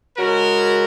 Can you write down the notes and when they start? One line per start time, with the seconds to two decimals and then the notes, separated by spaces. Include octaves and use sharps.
0.17 C#3 G#3 C#4 F#4 A#4